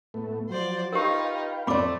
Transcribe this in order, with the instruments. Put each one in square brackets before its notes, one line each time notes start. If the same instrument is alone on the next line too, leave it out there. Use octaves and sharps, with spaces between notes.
[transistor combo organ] A2 A3 B3
[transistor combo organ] F3 F#3 [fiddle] C5 D5
[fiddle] D#4 F4 [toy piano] G4 A#4 [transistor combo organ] B4 F5 G5
[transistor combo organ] F2 [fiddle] A3 [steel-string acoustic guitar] C4 D5 [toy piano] B5 D6